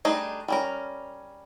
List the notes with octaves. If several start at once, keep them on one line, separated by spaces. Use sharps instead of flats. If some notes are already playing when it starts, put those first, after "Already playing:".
G3 A3 D4 D#4 G#4
G3 C#4 A#4